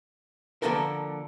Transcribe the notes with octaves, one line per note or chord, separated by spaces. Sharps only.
D3 F3 A#3 B3 A4 A#4